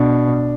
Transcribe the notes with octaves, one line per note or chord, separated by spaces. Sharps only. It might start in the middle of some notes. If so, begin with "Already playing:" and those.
Already playing: B2 D4 D5